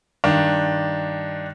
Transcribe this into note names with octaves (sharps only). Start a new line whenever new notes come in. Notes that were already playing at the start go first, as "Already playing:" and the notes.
G2 D#3 D4